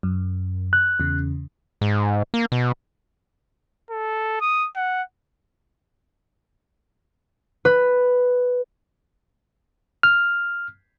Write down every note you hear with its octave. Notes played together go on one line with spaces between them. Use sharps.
F#2
F#6
E2 C#3
G#2
A#3
B2
A4
D#6
F#5
B4
F6